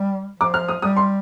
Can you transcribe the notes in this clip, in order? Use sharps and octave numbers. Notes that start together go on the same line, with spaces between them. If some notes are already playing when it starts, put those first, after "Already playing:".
Already playing: G3
F3 D6
F6
D#6
G3 D#6
C6